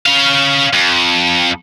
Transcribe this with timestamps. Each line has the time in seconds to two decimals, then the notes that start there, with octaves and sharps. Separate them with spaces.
0.06 C#4 F5
0.73 F2